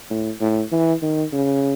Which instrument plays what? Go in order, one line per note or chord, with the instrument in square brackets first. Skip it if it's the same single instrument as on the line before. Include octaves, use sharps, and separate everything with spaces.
[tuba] A2
A2
E3
D#3
C#3